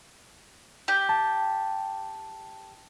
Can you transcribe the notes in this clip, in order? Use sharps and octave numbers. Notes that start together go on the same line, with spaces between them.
G4
A5